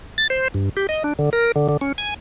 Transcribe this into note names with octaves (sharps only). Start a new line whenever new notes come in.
A6
C5
G2
G4
D#5
D4
D3
A#4
D3
D3
C#4
G#5